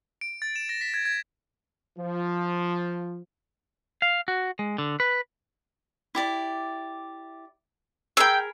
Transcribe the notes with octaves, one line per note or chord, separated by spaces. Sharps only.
D7
A6
E7
A#6
B6
G#6
G#6
F3
F5
F#4
G#3
D3
B4
E4 G4 D5
G#4 A#4 G5 B5 E6